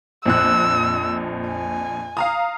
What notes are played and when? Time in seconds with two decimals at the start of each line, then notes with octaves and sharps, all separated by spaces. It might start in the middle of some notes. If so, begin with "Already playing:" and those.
0.25 A#1 F2 E6 F#6
1.48 G#5
2.17 F5 A#5 D#6